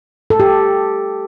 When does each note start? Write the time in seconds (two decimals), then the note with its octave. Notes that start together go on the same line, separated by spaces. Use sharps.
0.30 A4
0.40 G4